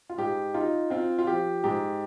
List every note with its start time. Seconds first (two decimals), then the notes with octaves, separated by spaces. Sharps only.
0.10 F4
0.18 G#2 G4
0.54 D#4 F4
0.90 C4 F4
1.19 F4
1.27 F3 G4
1.64 G#2 G4